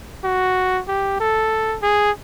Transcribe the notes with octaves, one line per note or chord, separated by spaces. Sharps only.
F#4
G4
A4
G#4